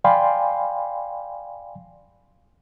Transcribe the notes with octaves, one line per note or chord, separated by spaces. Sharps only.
D5 F5 G5 G#5 B5 C6